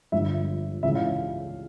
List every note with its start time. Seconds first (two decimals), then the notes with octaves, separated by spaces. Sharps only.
0.12 G1 G2 F3 E5
0.83 C#2 C#3 E3 E5
0.95 F5